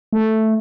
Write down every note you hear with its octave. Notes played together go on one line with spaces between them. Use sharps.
A3